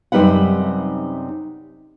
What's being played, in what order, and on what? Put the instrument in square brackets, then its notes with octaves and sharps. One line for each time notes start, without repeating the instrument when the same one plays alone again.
[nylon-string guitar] F#2 C3 G3 D#4 B4 F#5